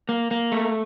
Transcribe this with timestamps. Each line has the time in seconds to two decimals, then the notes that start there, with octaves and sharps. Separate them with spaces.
0.09 A#3
0.31 A#3
0.52 A3